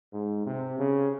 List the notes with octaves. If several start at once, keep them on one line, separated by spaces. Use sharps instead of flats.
G#2
C3
C#3